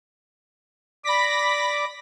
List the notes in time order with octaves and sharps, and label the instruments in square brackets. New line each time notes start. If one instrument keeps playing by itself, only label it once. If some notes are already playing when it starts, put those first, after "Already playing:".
[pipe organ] D5 D6 [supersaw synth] B5 A#6 B6